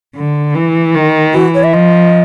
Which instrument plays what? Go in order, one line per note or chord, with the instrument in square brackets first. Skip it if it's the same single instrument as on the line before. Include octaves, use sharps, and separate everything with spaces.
[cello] D3
E3
D#3
[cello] E3 [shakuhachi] F#4
[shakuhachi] C#5
E5
[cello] F3 [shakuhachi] D#5